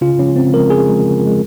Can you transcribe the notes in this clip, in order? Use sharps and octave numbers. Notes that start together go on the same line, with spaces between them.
C#3 F4
F3 G#3 C#4
C#3 C4
F3 G#3 A#4
C#3 G#4
F3 G#3
C#3
F3 G#3